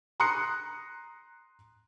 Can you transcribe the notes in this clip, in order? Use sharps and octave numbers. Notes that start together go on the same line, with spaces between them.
A#5 C6 D#6 F#6 C#7